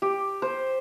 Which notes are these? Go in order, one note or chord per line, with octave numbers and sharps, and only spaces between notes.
G4
C5